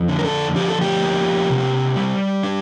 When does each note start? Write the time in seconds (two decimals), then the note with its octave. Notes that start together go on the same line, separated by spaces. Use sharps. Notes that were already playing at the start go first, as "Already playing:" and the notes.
Already playing: F2
0.08 D3
0.19 A#4
0.25 A4
0.55 F3 G4
0.69 A4
0.82 G4
1.03 A#3
1.50 C3
1.96 G3
2.43 D4